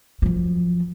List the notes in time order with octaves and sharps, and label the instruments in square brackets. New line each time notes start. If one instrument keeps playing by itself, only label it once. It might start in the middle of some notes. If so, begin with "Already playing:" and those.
[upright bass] F#2 F3